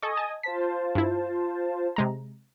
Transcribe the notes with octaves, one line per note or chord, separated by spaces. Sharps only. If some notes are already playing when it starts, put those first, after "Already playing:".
A4 D#5 G#5 C#6 D#6
A5
F4 C5 A5 B6
G2 E4
C3 G#3 A#5